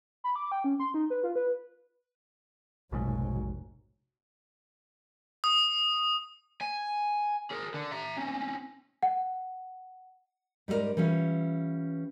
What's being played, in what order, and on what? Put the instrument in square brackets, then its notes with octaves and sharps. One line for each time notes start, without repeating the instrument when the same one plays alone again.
[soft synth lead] B5
D6
G5
C#4
C6
D#4
B4
F4
B4
[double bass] F1 F#3 [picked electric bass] A#1 G#2 [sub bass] B2
[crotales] D#6
[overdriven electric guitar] G#5
G#4 A#4
D3
E5 A#5
C4 C#4
[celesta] F#5
[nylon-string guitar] G#2 G3 C#4 F4 A#4 D5
E3 G3 C#4 F4